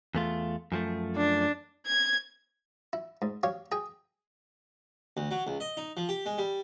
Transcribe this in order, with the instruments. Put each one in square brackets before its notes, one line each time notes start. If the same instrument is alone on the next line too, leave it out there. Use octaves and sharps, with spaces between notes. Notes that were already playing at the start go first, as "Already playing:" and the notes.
[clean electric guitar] E2 A3 F4
F#2 F3 A3
[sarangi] D4
[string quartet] G#6
[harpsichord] E4
G#2
G4 C#5 F5
G#4 G5
D2
F#3
C#2
D#5
D#4
F3
G4
G#3
G3